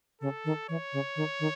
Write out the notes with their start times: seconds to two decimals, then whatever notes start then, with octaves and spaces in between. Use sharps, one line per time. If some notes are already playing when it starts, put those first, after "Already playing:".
0.21 C#3 A4
0.45 D#3
0.69 E3 C#5
0.93 C#3
1.16 D#3
1.40 D#3